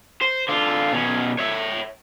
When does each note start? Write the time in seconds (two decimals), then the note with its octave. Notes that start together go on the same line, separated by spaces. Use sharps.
0.22 C5
0.49 D3 F4
0.93 B2 C#4
1.39 C#5 E5